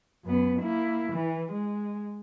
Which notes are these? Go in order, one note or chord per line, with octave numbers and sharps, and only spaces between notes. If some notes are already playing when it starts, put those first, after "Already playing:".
F#2 B3
A#3 E4
E3
G#3